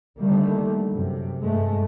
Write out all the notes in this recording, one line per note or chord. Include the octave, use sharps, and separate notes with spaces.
D3 D#3 G3 A3 A#3
F#2 C3
G2 G#3 A3